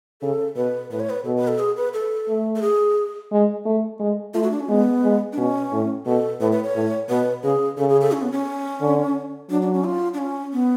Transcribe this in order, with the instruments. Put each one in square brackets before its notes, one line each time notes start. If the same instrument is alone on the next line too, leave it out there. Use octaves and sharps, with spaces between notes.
[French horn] C#3 [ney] A4
[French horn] B2 [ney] B4
[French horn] A2 [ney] B4
[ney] C#5
B4
[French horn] B2 [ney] A4
[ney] B4
A4
G#4
B4
A4
[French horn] A3
[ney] A4
G#4
[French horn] G#3
A3
G#3
[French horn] A3 [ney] F4
[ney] F#4
D4
C#4
[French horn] G#3 [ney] B3
[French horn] G#3
[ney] D4
[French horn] B2 [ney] C#4
[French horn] A2
[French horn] B2 [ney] A4
[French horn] A2 [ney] B4
[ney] B4
C#5
[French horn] A2
[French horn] B2 [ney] B4
[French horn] C#3 [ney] G#4
[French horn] C#3 [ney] A4
[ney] G#4
A4
C#4
B3
C#4
[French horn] D3
[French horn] F#3 [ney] D4
[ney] D4
C#4
F4
D4
C#4
B3